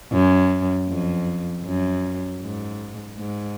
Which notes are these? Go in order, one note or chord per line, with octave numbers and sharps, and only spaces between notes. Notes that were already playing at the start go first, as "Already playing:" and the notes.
F#2
F2
F#2
G#2
G#2